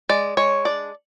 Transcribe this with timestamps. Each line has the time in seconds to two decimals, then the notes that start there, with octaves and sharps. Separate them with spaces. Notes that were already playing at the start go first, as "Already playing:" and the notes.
0.09 G#3 D5
0.37 G#3 C#5
0.65 D4 D5